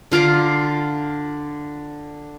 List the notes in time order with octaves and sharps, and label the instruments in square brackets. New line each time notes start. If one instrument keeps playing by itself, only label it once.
[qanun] D3 F4 A#5 D6